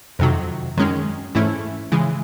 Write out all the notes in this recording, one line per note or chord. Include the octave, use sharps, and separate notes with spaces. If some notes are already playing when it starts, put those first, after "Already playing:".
F2 C3 D#3 F#3
F#2 D#3 G#3 C#4
G#2 E3 A3 C#4 E4
C#3 E3 G#3